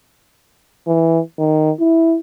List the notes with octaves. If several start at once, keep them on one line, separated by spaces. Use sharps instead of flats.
E3
D#3
E4